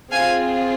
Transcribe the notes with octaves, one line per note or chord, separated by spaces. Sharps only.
C4 F4 G#4 F5 G#5